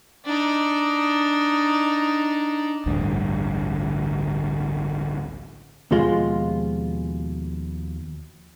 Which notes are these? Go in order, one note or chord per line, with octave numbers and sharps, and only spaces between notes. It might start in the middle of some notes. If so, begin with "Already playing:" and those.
D4 D#4
A1 D2 G2 D3
D#2 B2 F3 G#3 F4